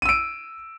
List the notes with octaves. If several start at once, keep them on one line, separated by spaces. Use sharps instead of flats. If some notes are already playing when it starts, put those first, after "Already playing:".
E6 D7 D#7